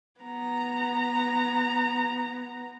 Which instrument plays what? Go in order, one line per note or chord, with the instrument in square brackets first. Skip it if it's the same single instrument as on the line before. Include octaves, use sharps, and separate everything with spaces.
[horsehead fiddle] B3 A#5